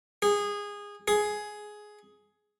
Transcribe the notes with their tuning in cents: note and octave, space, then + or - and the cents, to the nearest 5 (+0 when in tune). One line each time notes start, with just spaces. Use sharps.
G#4 -20
G#4 +10